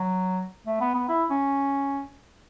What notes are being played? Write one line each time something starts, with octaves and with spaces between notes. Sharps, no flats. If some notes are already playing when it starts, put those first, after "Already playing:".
Already playing: F#3
A3
B3
B3
E4
C#4